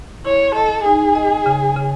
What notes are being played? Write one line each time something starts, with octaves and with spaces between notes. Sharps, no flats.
E4 C#5
A4 D#5
D#4 G#4
D#5
C#3
C#3